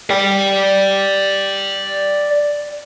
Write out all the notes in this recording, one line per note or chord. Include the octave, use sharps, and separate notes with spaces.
D5 G5